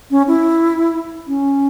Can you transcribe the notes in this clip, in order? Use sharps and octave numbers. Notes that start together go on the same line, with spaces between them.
C#4
E4
C#4